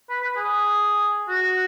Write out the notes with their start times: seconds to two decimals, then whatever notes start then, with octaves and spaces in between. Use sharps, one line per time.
0.10 B4
0.23 B4
0.36 G#4
1.28 F#4